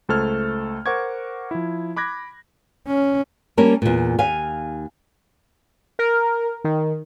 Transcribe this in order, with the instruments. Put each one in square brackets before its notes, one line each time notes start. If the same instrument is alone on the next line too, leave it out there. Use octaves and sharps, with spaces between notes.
[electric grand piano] C#2 A3 A4 C5 F6 G#6
A#4 C5 F#5 C#6 D6 G#6
F3 E4
B5 D6 F#6 G#6 A#6
[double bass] C#4
[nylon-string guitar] G3 A#3 C#4 A#4 A5
E2 A#2
D#2 F5 G#5
[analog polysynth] A#4
D#3